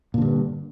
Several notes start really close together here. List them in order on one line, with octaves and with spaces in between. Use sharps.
A#2 D3 G2